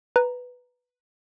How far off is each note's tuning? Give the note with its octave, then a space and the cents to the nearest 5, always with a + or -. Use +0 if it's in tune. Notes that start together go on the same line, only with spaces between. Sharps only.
B4 +0 A#5 +0